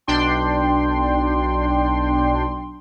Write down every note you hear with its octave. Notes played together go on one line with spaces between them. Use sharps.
B1 D4 G5 C6